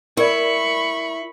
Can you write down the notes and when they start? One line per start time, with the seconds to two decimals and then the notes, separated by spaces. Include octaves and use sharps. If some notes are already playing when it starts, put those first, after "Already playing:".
0.17 E4 A#4 D5 B5 C#6